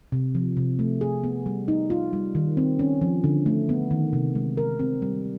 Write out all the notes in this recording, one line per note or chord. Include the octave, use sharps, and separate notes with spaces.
C3
F3
C3
A3
G#4
B3
G3
D#4
F4
G3
D#3
C4
C#4
F3
D3
A3
B3
D#3
C3
G#3
A#4
C4
G3